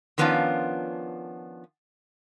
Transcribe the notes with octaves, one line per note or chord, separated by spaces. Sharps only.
D#3 F3 B3 C#4 D4 F4